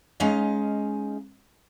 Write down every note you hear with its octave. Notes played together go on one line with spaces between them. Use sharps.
G#3 C#4 D#4 D#5 F5